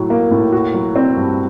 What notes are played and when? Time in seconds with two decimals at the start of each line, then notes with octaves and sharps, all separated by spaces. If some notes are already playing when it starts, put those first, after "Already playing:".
Already playing: A2 F#3
0.10 A#3
0.31 A2
0.52 F#4
0.74 F#3
0.96 C4
1.16 G2